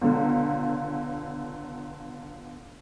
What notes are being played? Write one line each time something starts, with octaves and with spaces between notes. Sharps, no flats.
C#2 B2 D3